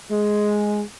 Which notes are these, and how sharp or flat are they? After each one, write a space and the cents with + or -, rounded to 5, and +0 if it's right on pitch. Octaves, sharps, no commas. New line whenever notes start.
G#3 +5